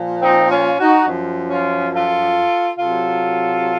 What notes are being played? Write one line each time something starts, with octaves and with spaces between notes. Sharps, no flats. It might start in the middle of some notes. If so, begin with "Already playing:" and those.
Already playing: A#2 F3
C4 D#4
C#4 F4
D#4 F#4
F#2 F3
C#4 F4
F4 A4
C3 F#3 F4 A4